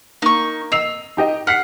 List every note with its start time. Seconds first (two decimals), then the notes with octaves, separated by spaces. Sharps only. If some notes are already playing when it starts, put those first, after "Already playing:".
0.22 A#3 D#4 C#6
0.72 D#5 E6 C7 F7
1.17 D#4 G4 D#5
1.47 F#5 F6 B6 C7